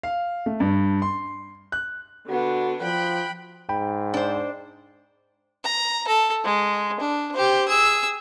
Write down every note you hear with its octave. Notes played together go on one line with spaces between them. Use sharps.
F5
A3
G2
C6
F#6
D3 B3 D4 F#4
F3 G5 B5 F#6
G#2 G5 B5
D4 C5
A#5
A4
G#3
D4
G4 C5
G#4 E6